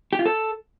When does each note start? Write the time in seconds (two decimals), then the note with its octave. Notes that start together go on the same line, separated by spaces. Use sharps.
0.13 G4
0.19 F4
0.26 A4